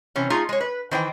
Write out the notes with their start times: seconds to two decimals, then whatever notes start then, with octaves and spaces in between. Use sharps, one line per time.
0.16 C3 E3 C#4
0.30 A3 D#4 F4 G#4
0.49 G#3 C#5
0.61 B4
0.91 D#3 E3 C5 G5